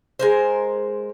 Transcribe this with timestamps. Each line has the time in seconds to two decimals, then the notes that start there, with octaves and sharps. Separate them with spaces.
0.19 G#3 A#4 C5